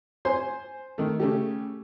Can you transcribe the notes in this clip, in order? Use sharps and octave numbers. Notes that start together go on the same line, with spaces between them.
C5 G#5 C6
D#3 A3
C#3 A3 G4